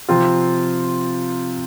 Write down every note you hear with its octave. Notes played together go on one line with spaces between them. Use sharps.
C3 F3 C4 F4